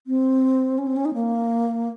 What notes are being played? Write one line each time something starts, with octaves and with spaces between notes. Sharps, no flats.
C4
C#4
C4
C#4
D#4
A#3